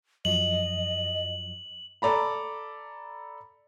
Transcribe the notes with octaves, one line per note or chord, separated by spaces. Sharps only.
F#2 F3 F#3 D#5 F#7
A4 D5 A#5 B5